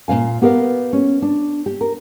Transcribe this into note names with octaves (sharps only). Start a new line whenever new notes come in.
A#2 G#3 F5 G#5
B3 G4 A#4 B4 F5
C#4
D4
G4
A#4